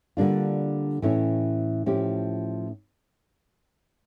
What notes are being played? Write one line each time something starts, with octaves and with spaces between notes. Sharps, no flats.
D3 G3 A#3 D4 F4
A2 E3 A3 C#4 E4
A2 F3 C#4 E4 G4